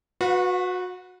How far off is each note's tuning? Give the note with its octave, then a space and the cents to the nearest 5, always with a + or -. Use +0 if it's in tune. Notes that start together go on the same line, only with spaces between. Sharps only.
F#4 -25 B4 +0 F5 +40